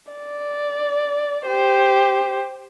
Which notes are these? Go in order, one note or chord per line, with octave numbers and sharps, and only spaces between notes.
D5
G4 C5